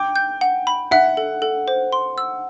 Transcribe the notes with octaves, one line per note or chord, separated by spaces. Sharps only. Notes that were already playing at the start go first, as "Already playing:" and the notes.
Already playing: G5 D6
G6
F#5
B5
E5 F#5
A4
A4
C5
C6
E6